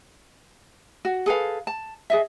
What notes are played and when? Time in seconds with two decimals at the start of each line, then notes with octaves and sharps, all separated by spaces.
1.05 F#4
1.26 G#4 A4 B4 F5
1.67 A5
2.10 G#4 D#5 E5